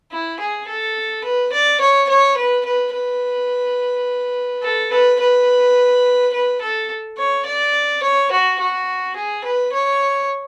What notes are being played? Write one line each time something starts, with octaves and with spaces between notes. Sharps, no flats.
E4
G#4
A4
B4
D5
C#5
C#5
B4
B4
B4
A4
B4
B4
B4
A4
C#5
D5
C#5
F#4
F#4
G#4
B4
C#5